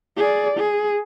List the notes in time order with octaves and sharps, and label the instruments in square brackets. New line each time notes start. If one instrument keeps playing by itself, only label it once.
[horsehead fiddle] G#4 D5
G#4